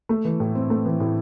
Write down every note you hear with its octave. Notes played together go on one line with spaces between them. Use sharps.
A3
E3
A2
C4
A3
E3
A2